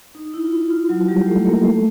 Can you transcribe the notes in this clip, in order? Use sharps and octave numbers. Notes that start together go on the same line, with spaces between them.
D#4
E4
F4
E4
F4
F#3 F#4
G3 G4
A3 A4
A#3 A#4
A3 A4